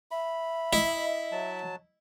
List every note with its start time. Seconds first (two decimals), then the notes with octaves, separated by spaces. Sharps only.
0.11 E5 B5
0.73 E4 D#5
1.32 F#3 A5